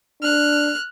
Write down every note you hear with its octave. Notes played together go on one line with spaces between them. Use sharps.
D4 F6 F#6